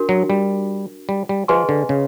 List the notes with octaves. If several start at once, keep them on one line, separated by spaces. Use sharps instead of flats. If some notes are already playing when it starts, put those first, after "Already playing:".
Already playing: D4 F#4 A#4
F#3
G3
G3
G3
F3 G#4 B4 D#5 G#5 C6
D3
C#3